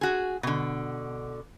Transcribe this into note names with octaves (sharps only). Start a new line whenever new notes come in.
F#4 G#4
B2 D3